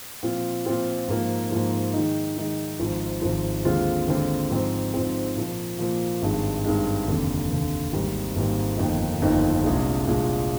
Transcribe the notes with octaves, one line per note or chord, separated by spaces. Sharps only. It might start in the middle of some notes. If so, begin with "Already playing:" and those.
A#2 F3 C4 F4
A#2 F3 C4 F4
G#2 F3 A#3
G#2 F3 A#3
D#3 G#3 D#4
D#3 G#3 D#4
G#1 G#2 F3
G#1 G#2 F3
D#2 D3 G#3 C4 F4
D#2 D3 G#3 C4 F4
G#2 F3 C4
G#2 F3 C4
A#2 F3 A#3
A#2 F3 A#3
G#1 G2 D#3 G#3
G#1 G2 D#3 G#3
F1 D#2 D3
F1 D#2 D3
G#1 G#2 G3 A#3
G#1 G#2 G3 A#3
G1 F2 D#3 A#3 D#4
G1 F2 D#3 A#3 D#4
C2 A#2 G#3 D4 G#4
C2 A#2 G#3 D4 G#4